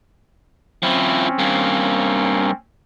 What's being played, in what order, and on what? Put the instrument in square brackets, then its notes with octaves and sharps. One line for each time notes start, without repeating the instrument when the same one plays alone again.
[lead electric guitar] F3 E4 [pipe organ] C4 C#4
[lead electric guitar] G2 A#3